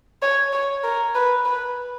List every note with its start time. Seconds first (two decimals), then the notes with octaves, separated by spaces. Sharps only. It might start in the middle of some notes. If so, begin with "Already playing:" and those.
0.22 C#5
0.53 C#5
0.84 A#4
1.15 B4
1.45 B4